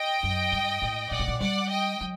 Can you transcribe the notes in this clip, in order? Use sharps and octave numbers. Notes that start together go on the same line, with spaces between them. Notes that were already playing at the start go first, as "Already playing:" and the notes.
Already playing: D#5 G5
F#2
G2
A2
A#2 D5 F#5
A2
A#2
G3 D5 F#5
D#5 G5
F#3